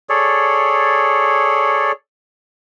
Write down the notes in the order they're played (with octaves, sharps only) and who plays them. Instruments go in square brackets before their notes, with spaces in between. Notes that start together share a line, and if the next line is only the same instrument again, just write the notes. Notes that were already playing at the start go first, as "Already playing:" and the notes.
[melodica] G#4 A4 C#5 D5